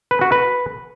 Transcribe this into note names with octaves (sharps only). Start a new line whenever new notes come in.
B4
F#4
B4